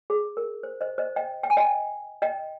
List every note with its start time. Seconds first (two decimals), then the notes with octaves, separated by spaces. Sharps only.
0.10 G#4
0.37 A#4
0.63 C5
0.81 C5 D#5
0.98 C5 D#5
1.16 D#5 G5
1.43 G5
1.50 G#5
1.57 D#5 G5
2.22 D#5 G5